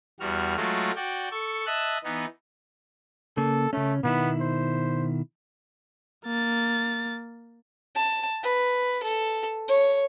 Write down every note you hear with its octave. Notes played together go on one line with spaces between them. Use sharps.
E2 G3 F#4 F6
F#3 G#3 A3 F4 F#4
F#4 D5 G5
A4 C#6
D#5 E5 A5 F#6
E3 B3 D#4
C#3 A#3 A4
C#3 A3 C#4
B2 D#3 B3 E4
C5
A#3 A6
A5
B4
A4
C#5